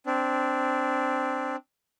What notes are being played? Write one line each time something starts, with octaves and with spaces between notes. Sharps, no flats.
C4 D4